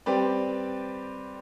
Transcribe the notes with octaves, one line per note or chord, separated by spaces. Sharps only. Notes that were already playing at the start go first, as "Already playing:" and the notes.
G3 C4 G4 B4 D5